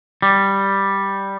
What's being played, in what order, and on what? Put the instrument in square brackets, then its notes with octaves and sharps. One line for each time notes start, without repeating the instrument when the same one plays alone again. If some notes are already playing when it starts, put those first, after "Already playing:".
[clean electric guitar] G3